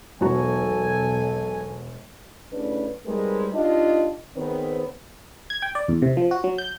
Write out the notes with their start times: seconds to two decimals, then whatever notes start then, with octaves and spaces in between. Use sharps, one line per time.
0.21 E1 B1 F#4 A4 G#5 A#5
2.51 A2 C#3 D4 B4
3.06 G3 G#3 C4 D#4 A#4 B4
3.53 D4 D#4 F4 G4 D#5
4.36 D#3 B3 C4 G#4 B4 C#5
5.50 G#6
5.62 G5
5.75 D5
5.88 E2
6.02 C3
6.17 F3
6.31 F#4
6.44 F#3
6.58 G6